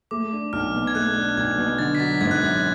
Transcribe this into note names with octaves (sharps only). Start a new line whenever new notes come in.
A3 D6
D4
B1 F6
B2
G#6
A3 F#6
D4
B1 G#6
B2
D3 A6
B6
F#3 A6
G#1 G#6
F#6
F#2 G#6